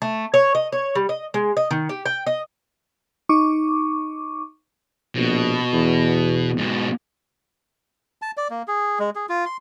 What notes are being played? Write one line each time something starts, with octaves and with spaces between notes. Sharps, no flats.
A3
C#5
D#5
C#5
G3
D#5
G#3
D#5
D#3
G4
G5
D#5
D#4 C#6 D6
A#1 B2
E2
G#2 B2
A5
D5
A#3
G#4
G#3
G#4
F4
C6